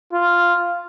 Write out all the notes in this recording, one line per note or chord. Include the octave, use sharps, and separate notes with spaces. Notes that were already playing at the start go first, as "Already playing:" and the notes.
F4